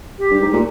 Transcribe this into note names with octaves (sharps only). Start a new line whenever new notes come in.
G4
G2
G#2
A#2